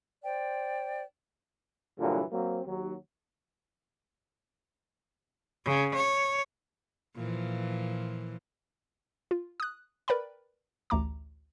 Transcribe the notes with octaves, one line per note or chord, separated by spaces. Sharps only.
C5 D5 G5
G2 A#2 D3 E3 F#3
F#3 A#3 C4
D#2 F#3
C#3
C#5
A#2 E3 F3
F4
D#6 F#6
A#4 B4 D5 G5 B5
A1 D2 A3 A#5 D6